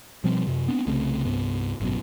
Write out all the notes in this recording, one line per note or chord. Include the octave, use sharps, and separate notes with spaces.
B2 F3 G3 C4
F#2 C3
B3 C4 D4
C2 C#3 A3 C4
C2 G2 B3
G#1 F#2 B2